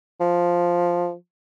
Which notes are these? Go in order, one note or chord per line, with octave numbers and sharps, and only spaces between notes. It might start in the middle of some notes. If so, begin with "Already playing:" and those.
F3